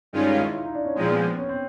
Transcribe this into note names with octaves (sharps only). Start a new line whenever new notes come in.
G2 D#3 G#3 C#4 F4
D#4
E4
F4
D#4
D4
C#4
A#2 F3 G#3 C4
B3
C#4
C4